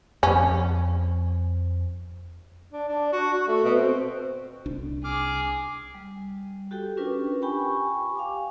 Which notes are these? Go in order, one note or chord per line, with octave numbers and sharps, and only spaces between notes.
F2 F3 C#4
D4
D4
F#4
F#4
A3
B2
C4
C2 D4
G#4 D6 F6
G3
F#4 G4 A4 G5
C#4 D4 F4 A#4 B4
G4 G5 G#5 B5 C#6
F5 G#5 D6